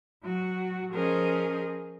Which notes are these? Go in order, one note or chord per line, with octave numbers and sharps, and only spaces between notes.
F#3 F#4
F3 C#4 G#4 A#4 C5 D#5